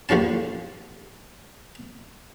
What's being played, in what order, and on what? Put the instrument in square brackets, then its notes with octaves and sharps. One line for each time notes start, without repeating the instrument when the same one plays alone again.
[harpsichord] D#2 D3 F3 C#4 A5